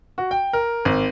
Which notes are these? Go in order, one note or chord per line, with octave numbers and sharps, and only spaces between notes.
F#4
G5
A#4
G#1